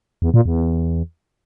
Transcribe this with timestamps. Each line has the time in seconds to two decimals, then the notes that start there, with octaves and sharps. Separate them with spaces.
0.22 E2
0.34 A#2
0.46 E2